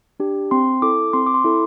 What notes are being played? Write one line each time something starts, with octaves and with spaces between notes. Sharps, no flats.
D4 G4
C4 C6
E4 A4 D6
C4 C6
D6
C6
E4 A4